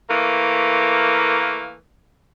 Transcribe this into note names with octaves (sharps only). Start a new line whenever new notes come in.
E3 A3 A#3